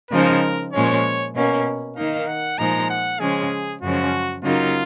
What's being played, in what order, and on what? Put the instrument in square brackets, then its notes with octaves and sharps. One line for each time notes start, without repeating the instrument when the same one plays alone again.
[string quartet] C#3 F3 G#3 D#4 [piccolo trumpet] A#4
[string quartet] A#2 F3 G#3 C#4 [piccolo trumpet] C#5
[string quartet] B2 A#3 C#4
[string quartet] D#3 A#3 D#4 [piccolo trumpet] F5
[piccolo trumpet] F#5
[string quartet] A#2 F3 G#3 D#4 [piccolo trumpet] A#5
[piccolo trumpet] F#5
[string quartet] C#3 F3 G#3 C#4 [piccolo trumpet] G#4
[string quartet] F#2 C#3 F3 G#3 C#4 [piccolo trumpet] F#4
[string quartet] C#3 F#3 A#3 D#4 [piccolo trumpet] F4